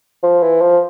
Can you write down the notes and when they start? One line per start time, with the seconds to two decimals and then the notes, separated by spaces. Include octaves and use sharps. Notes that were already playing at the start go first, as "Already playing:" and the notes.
0.23 F3
0.42 E3
0.61 F3